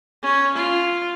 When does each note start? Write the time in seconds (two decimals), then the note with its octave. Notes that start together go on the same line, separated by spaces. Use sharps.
0.23 C#4
0.54 F4